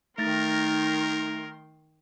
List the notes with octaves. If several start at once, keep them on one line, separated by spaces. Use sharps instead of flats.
D#3 A3 D#4 A#4 C6 A6 A#6